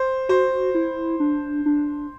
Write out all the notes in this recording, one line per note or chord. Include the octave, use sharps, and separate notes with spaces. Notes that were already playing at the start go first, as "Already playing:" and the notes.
Already playing: C5
F#4 C5
E4
D4
D4